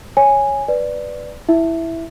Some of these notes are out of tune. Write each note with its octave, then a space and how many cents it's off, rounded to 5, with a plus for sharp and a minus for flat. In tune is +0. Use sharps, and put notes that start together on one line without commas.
C#5 +0 G#5 -5
B4 +0 D5 +0
E4 +0 E5 +0